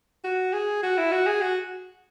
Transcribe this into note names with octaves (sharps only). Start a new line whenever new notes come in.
F#4
G#4
F#4
E4
F#4
G#4
F#4